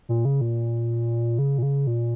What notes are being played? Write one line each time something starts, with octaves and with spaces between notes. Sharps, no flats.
A#2
C#3
A#2
C#3
A#2
C#3
A#2